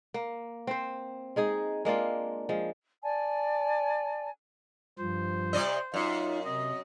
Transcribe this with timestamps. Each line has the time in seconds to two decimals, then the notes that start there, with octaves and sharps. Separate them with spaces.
0.14 A#3
0.67 C4 C5
1.36 G#3 D#4 G#4
1.85 G#3 A#3 D4 F4
2.49 F3 G#3
3.02 D5 G#5 A5
4.99 G2 F3 C5
5.53 C3 D5 D#5
5.94 F#2 D#4 F4
6.45 C3 D#5